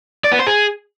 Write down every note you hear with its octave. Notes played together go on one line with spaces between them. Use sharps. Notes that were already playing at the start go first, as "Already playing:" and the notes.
D5
B3
C5
G#4